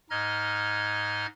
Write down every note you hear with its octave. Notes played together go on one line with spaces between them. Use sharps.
G#2 D#4 D#5 F6 G#6